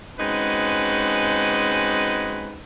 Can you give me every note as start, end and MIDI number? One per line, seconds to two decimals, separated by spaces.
0.19 2.61 56
0.19 2.61 60
0.19 2.61 61
0.19 2.61 63
0.19 2.61 66
0.19 2.61 71